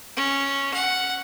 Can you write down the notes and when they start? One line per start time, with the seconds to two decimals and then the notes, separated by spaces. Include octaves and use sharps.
0.17 C#4
0.74 F#5